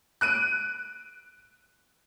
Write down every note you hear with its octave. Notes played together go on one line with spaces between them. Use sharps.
F#6 D7 D#7